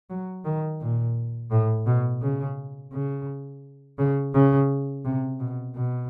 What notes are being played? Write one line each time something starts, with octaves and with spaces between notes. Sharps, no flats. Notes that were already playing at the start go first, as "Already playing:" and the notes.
F#3
D#3
A#2
A2
B2
C#3
C#3
C#3
C#3
C3
B2
B2